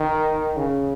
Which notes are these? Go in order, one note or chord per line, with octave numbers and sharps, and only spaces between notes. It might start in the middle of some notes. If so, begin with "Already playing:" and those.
Already playing: D#3
C#3